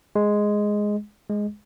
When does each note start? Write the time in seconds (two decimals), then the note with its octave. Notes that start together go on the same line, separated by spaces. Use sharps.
0.16 G#3
1.29 G#3